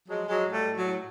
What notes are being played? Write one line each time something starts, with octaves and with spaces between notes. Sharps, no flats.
F3 F#3 G#3
F3 F#3 G#3
A2
G3 A3
A2
F#3
A2